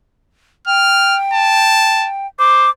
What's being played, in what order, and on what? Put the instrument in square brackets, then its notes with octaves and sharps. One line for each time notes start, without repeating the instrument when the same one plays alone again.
[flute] G5 [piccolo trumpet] F6
[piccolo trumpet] A5
[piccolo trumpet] C5 [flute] D6